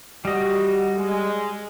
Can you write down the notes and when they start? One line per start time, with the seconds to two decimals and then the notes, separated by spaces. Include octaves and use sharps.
0.25 G3 F#4 G4 D#5
0.97 G#3